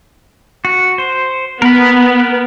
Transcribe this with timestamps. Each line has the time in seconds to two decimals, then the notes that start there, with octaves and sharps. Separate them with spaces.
0.65 F#4
0.98 C5
1.62 B3 A#4 B5